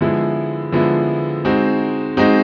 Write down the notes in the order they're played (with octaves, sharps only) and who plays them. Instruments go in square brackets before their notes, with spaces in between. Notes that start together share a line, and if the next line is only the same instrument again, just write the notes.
[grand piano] D3 F3 G#3 B3 E4
D3 F3 G#3 B3 E4
G#3 C4 D#4 F#4
G#3 C4 D#4 F#4